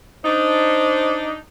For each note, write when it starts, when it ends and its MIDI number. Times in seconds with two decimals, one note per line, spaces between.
0.25 1.36 62
0.25 1.36 63
0.25 1.29 72